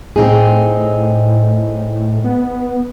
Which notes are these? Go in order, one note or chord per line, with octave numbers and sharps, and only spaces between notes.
A2 C4 D#4 G#4
B3